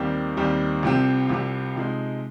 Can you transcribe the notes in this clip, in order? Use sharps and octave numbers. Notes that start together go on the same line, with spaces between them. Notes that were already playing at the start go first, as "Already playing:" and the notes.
Already playing: D#2 D#3 G3 C4 G4
D#2 D#3 G3 C4 G4
C2 C3 F3 C4 G4
C2 C3 F3 C4 G4
C3 F3 G#3 D#4